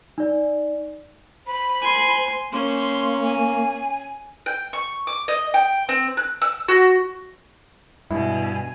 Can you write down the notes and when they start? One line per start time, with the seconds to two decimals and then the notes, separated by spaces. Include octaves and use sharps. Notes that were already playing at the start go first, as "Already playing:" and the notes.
0.18 D#4 D5
1.47 C5 B5
1.81 G#5 C6
2.52 A#3 C#4 C6
3.24 G#5
4.46 G5
4.73 C#6
5.07 D6
5.28 D#5
5.54 G5
5.89 C4
6.17 F#6
6.42 E6
6.68 F#4
8.11 G2 B2 E4 G#5